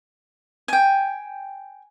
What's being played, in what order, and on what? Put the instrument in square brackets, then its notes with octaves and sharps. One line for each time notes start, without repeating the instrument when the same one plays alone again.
[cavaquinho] G5 G#5